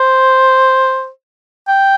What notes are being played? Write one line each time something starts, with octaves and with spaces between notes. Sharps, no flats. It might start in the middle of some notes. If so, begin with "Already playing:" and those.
Already playing: C5
G5